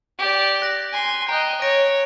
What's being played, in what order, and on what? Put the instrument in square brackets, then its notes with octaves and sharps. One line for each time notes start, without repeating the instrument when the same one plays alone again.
[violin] G4 D5
[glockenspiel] F#6 A#6
[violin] G#5 C6
[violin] D#5 G5 [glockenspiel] A#5 F#6
[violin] C#5 [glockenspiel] A#6 D7